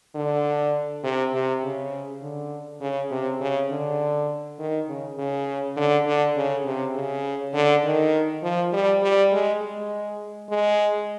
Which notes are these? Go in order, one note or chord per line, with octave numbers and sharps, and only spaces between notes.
D3
C3
C3
C#3
D3
C#3
C3
C#3
D3
D#3
C#3
C#3
D3
D3
C#3
C3
C#3
D3
D#3
F3
G3
G3
G#3
G#3
G#3